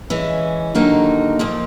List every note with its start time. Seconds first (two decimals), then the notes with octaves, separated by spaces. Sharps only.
0.10 E3 G#3 C#4
0.75 D#2 D3 F#3 A#3 D#4
1.39 A#2 F3 A#3